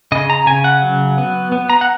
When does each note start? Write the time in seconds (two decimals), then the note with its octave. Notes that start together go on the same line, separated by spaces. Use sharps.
0.12 C#3 D#5
0.30 A#5
0.46 C#3 G#5
0.64 F#5
0.82 F#3
1.18 B3
1.52 B3
1.70 A#5
1.81 F#5